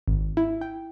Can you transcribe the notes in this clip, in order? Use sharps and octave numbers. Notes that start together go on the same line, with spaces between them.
G#1
E4
G5